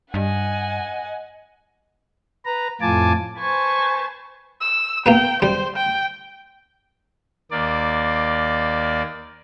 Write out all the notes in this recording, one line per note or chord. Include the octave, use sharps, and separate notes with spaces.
G2 D#5 F#5 G#5
B4 A#5
F2 A2 F4 G#5 A5 D6
B4 C5 G#5 A5 C#6
E6
A#3 B3 B4 G5
G3 C5
G5
D#2 A#3 D5